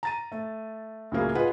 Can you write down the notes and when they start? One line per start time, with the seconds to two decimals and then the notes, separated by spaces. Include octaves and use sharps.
0.03 A#5 A6 D#7
0.32 A3
1.12 C#2 A2 C#3 F#3 A#3 G#4
1.35 F4 G#4 B4 D#5 F#5